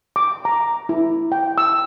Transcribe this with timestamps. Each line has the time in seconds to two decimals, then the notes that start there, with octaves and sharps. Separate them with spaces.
0.16 D6
0.45 A#5
0.89 E4
1.32 G5
1.58 E6